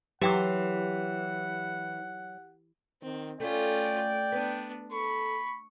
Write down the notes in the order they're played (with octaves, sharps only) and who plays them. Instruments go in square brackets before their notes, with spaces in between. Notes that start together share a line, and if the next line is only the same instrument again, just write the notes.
[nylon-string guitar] E3 [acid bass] F#3 [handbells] G4 G5 D6 [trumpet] F#5
[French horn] D#3 [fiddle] C4
[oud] A3 [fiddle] C#4 F4 [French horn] D5 [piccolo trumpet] G5
[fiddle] B3 D4 [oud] B4
[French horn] A4 [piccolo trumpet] B5 [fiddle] C#6